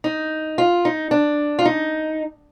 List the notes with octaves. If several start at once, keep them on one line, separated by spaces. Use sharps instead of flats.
D#4
F4
D#4
D4
F4
D#4